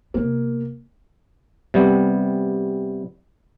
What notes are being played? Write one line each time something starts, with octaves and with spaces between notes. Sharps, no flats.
C3 A#3 B3
C3 G3 B3